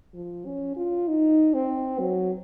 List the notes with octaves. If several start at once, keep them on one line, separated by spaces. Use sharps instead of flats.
F3
C#4
F4
D#4
C4
F#3